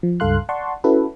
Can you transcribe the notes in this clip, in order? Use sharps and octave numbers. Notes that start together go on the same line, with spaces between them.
F3
C#2 G2 A4 F5 C6 F#6
D5 F#5 A5 C6 C#6
C#4 E4 F#4 A4 B4